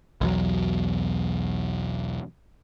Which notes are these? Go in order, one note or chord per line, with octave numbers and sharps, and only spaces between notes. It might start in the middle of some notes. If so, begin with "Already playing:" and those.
B1 E2 F#3